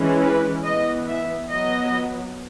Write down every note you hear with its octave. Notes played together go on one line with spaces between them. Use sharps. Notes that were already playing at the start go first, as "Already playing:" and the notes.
Already playing: E3 G#3 C#4
B4
E3 B3 D#5
E5
F#3 B3 D#5